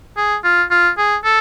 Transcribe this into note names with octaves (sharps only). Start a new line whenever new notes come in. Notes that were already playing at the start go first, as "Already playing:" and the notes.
G#4
F4
F4
G#4
A4